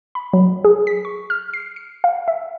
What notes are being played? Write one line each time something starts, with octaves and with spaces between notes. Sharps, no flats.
B5
F#3
G#4
B6
C#6
F6
C7
C#7
F5
E5